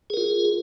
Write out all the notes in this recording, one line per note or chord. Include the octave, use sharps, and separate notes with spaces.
F4 G#4 A#4